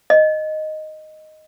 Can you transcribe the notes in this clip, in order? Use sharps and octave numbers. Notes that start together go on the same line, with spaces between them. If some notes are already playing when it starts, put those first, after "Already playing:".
D#5